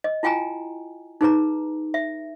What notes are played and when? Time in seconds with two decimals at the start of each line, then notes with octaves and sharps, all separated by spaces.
0.04 D#5
0.23 E4 F4 G5 G#5 A#5
1.21 D#4 G#4 B4 A#5
1.94 E5